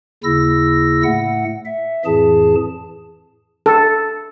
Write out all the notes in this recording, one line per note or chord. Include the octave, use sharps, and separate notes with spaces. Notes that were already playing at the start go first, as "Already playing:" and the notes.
D#2 C#3 E4 E6 A#6
A2 A3 F#5
E5
F2 A2 E3 G#4 A5
A4